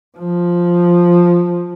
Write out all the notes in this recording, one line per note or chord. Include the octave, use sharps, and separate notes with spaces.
F3